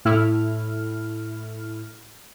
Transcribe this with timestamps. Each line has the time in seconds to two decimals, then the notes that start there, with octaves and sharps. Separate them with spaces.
0.05 A2 A3 E4 F6